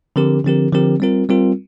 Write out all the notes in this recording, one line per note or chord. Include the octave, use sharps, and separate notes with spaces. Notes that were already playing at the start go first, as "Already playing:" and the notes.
D3 F3 C4 G4 A#4
D3 F3 C4 G4 A#4
D3 F3 C4 G4 A#4
G3 C4 F4 A#4
G3 C4 F4 A#4